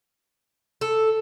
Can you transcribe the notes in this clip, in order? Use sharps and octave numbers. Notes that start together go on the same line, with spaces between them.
A4